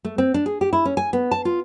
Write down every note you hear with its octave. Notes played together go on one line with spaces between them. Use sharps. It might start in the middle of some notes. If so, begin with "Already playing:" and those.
A3
C4
D4
G#4
G4
E4
C#4
G#5
B3
A5
F4